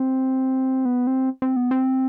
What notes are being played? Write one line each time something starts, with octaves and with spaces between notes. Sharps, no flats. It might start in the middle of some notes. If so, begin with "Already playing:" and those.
Already playing: C4
B3
C4
C4
B3
C4